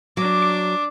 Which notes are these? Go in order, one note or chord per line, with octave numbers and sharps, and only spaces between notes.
F#3 D4 D6